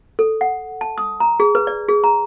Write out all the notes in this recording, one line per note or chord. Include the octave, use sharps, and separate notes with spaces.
A4
F#5
A5
D#6
A#5
G#4
B4
D5
G#4
A#5